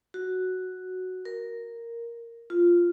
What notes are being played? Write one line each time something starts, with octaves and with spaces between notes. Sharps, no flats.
F#4
A#4
F4